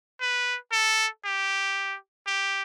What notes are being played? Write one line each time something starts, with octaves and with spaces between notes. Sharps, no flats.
B4
A4
G4
G4